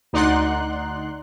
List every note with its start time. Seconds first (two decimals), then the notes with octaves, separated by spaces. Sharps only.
0.13 D2 D#4 D5 F#5 C6 F#6